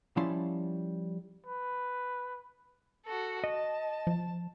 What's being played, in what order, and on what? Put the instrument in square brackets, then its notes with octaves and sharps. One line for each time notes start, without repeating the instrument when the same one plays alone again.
[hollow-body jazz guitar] F3 G3 C#4 E4 A5 C6
[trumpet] B4
[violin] F#4 A4
[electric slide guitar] D#5 [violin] A5
[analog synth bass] F3